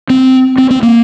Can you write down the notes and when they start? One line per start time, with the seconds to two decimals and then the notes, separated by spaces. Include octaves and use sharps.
0.10 C4
0.58 C4
0.71 C4
0.83 A#3